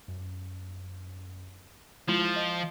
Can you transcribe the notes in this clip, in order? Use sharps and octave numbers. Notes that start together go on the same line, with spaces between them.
F#2
F3 G#3 E4 F4
D#5 C7 D7